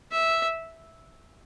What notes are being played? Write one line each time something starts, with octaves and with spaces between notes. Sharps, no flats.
E5